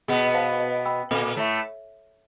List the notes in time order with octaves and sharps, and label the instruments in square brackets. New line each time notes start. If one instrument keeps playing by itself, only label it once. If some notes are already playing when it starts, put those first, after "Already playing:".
[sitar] B2 B3 [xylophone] G#4
[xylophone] C5 F5 A5
D#5
G5 B5 E6
[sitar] A#2 A#3 [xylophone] A4
[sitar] A2 A3 [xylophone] C#5 E5